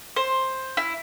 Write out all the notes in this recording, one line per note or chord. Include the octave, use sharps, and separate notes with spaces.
C5
E4